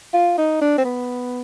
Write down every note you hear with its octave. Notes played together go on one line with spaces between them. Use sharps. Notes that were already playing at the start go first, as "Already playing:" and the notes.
F4
D#4
D4
C4
B3